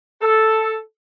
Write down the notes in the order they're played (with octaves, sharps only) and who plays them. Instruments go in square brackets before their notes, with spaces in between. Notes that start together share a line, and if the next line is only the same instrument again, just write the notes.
[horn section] A4